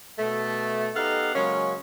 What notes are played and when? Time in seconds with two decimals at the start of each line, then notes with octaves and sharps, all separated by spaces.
0.19 B2 A3
0.95 B3 D#4 G4 A4 F5 F#5
1.35 C#3 F#3 G#3 A#3 C#4